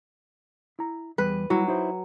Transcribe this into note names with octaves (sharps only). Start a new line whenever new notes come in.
E4 A#5
E2 G3 B4
F#3 G3 E4 F#4
D#4 E4 C5